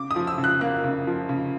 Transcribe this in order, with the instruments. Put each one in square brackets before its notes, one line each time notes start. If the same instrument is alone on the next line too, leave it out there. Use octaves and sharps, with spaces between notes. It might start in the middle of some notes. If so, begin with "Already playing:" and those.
Already playing: [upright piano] C#3 D6
D#6
F3
E6
C#3
F#6
A#3 F#6
C#3
F3
C#3